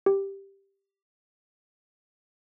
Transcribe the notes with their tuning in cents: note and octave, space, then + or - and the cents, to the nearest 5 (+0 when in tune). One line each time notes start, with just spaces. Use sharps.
G4 +0